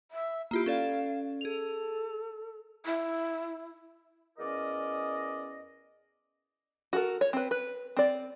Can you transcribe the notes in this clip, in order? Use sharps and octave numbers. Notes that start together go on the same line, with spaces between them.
E5
A#3 E4 F4 G4
C#4 A4 D5 F5
G#4 A4 F7
E4
E2 C#4 A#4 D5 D#5
F#4 A4 A#4
C#5
C4 B4
B4
C4 D5